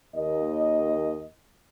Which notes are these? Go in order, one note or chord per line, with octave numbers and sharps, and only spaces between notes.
D#2 D#5